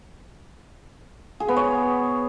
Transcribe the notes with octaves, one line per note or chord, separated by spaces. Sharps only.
G#4
B3
C#5